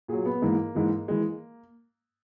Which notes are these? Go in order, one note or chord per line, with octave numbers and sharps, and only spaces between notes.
A#2 F#3 G#4
B3
G#2 E3 G#3 A#3
G#2 E3 G#3
E3 G#3